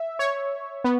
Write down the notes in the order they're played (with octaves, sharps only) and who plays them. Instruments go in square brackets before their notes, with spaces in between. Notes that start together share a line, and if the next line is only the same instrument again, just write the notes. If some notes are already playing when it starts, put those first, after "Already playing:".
Already playing: [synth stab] E5
C#5
B3